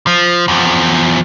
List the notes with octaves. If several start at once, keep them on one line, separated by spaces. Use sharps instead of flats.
F3
E2 F3